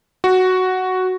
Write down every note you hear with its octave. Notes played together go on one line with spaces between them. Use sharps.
F#4